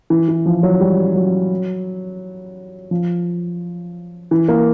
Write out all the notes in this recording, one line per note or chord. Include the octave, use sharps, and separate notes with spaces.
E3
E3
F3
F#3
G3
F#3
F3
E3
A#3